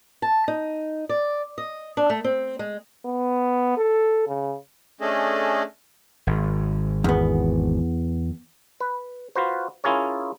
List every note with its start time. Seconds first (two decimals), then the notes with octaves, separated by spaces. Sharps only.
0.22 A5
0.48 D#4
1.09 D5
1.58 D#5
1.97 D4
2.10 A3
2.24 C4
2.59 G#3
3.05 B3
3.77 A4
4.27 C#3
5.01 A3 C#4 D4 G#4 A4 D#5
6.27 G#1
7.04 E2 B3
8.80 B4
9.35 F4 F#4 B4 C5
9.84 C#4 E4 F4 G#4 A#4 C#5